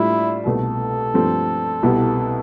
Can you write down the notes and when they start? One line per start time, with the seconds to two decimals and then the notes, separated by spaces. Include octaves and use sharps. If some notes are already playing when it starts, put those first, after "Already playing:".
Already playing: A2 G3 D4 E4 F4
0.46 C2 B2 A3 A4
1.14 G2 F3 A3 C4
1.83 C2 B2 B3 E4 G4